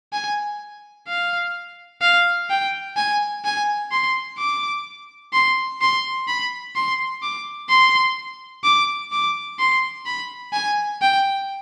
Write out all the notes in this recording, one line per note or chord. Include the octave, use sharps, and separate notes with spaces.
G#5
F5
F5
G5
G#5
G#5
C6
D6
C6
C6
B5
C6
D6
C6
D6
D6
C6
B5
G#5
G5